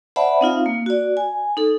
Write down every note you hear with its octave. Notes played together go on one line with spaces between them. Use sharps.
C5 D5 E5 F#5 A5 B5
C4 D#4 F4 F5
A#3
F#4 D5
G#5
D#4 A4